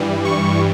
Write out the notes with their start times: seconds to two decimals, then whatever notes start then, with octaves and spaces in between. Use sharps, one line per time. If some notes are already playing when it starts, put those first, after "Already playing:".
Already playing: G2 E3 G3
0.25 C#6